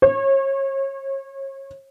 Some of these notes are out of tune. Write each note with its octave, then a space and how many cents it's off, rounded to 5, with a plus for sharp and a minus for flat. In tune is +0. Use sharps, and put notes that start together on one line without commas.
C#5 -35